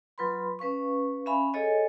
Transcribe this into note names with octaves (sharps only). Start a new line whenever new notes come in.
F#3 F4 B4 B5 C6
C#4 B4 F5 C#6
C#4 E5 F5 G#5 B5
G#4 A4 C#5 D#5 G#5